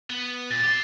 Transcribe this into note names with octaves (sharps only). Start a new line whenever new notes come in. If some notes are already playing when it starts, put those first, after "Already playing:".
B3
A#2 A6
G4 C6